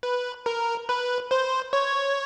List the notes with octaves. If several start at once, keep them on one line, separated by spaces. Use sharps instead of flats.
B4
A#4
B4
C5
C#5